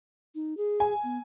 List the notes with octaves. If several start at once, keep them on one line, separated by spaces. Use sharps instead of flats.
D#4
G#4
G#5
B3